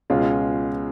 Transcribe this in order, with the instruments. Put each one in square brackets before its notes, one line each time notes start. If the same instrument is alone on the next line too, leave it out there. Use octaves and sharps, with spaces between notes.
[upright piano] C#2 B2 G#3 C#4 F4